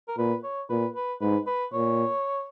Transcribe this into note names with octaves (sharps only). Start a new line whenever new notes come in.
A#4
A#2 B4
C#5
A#2 B4
B4
G#2 B4
B4
A#2 C#5